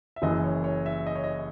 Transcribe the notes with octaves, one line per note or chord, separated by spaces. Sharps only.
E5
F#1 F#2 E3 D#5
C#5
C#5
E5
D#5
C#5
D#5